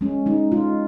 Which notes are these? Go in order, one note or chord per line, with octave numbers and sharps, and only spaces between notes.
G#3 C#4
G#3 D#4
G#3 F4